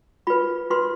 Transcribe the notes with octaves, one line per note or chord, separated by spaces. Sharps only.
F4 B4 B5
F4 B4 C6